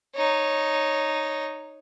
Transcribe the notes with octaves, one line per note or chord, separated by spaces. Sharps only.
D#4 C#5